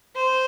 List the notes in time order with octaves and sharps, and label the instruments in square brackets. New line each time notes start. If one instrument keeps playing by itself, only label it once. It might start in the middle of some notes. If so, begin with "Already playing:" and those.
[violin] C5